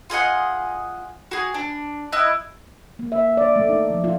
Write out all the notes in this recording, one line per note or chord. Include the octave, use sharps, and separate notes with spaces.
F4 G#4 D#5 F#5
F#4 G#4
D4
E4 D#5 F#6
A#3
E5
D5
A3
D#4
F3
F4